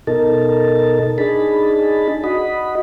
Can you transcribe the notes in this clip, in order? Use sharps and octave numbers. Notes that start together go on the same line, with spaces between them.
B2 D#4 A4 A#4 A5
D4 D#4 G#4 A5 B5
F#4 D#5 B5